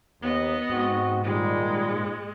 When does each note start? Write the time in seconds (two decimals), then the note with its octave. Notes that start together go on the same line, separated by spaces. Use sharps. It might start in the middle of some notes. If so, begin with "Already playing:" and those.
0.22 D#2 B3 D#5
0.70 G#2 C4 F#4
1.23 A#2 D#3 G3 G#3